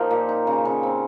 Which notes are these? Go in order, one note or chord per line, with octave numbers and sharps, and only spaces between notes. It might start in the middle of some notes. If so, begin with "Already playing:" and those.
Already playing: F3 A#3 D#4 F4 G4 C5
A#2
D#4
C#3
C#3
C4